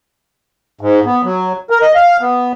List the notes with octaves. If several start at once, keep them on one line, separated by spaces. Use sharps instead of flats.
G#2
B3
F#3
A#4
D#5
F5
B3